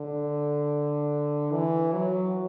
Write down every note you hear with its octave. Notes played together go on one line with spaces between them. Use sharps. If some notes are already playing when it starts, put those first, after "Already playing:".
Already playing: D3
E3
F#3